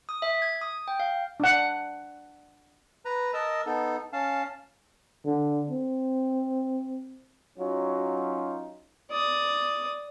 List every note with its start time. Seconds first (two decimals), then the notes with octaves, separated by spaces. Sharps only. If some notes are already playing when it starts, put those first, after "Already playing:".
0.09 D#6
0.22 E5
0.42 G#6
0.61 D#6
0.88 G5
1.00 F5
1.40 D4 F#5
3.05 B4 A#5
3.34 A#4 D#5 A5 E6
3.66 B3 D#4 A4
4.13 C#4 F5 A5
5.26 D3
5.70 C4
7.58 F#3 C#4 D#4 F4
9.10 D5 D#6